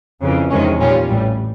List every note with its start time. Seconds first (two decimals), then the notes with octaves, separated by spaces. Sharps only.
0.21 F2 C#3 E3
0.50 E2 C3 D#3 G#3 C#4
0.79 A#2 G3 A#3 C#4 F4
1.08 A1 A2 E3 G3